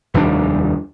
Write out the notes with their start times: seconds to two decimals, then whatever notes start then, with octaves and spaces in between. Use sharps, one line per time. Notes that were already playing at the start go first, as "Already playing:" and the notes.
0.14 F1 D#2 G3 D4